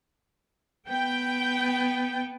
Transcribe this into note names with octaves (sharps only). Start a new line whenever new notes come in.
B3 G5